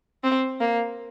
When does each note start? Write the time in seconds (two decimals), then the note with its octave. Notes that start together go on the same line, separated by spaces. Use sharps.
0.24 C4
0.60 A#3